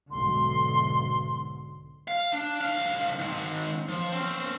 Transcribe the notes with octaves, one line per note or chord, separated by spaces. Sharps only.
B1 G#2 D3 C6
F5
D4
C2 F5
D#3 C4
F3
C4 C#4